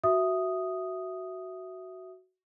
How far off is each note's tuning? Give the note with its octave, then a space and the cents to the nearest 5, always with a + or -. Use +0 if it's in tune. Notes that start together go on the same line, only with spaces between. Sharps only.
F#4 +5 E5 +0 D#6 +0